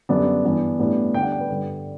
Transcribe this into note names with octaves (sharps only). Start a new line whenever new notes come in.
F#2 D3 G3 B3 D4
G2 E3 B3 D4
A2 G3 B3 D4
D3 G3 D4 G5
F#5
G5
B4
G2 D3 G3 D4